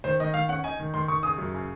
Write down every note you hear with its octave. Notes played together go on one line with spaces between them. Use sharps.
D#3 C5
D#3 D#5
D#3 F5
C#4 F#5
D#4 G#5
D#3
D#3 C6
D#3 C#6
C#3 D#6
F#2
C#3